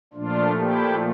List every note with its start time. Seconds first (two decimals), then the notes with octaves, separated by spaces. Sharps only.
0.13 A#2 F3 A3 D4 F4
0.56 E4 G4